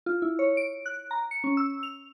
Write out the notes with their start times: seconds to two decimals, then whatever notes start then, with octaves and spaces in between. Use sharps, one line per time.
0.06 F4
0.22 E4
0.39 C#5
0.57 D7
0.86 F#6
1.11 A#5
1.31 C#7
1.44 C#4
1.57 E6
1.83 F7